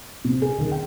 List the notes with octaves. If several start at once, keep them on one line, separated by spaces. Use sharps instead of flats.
C3
G#4
D#3
G5